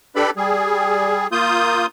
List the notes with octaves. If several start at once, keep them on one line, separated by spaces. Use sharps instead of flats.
D4 G4 A4 B4 D5 B5
G3 G#4
A#3 F4 D#6 G6